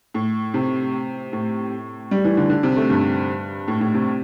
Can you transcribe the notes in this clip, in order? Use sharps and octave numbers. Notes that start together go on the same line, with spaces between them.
A2
C3
A2
G3
E3
D3
D3
C3
A3
G2
A2
A2
C3